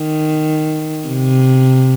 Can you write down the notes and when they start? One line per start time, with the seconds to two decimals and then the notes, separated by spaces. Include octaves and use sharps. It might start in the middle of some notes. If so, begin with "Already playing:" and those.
Already playing: D#3
1.08 C3